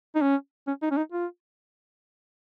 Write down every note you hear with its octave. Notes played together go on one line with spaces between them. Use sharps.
D#4
C#4
C#4
D#4
C#4
D#4
F4